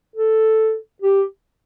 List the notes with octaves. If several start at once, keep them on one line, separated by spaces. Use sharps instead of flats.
A4
G4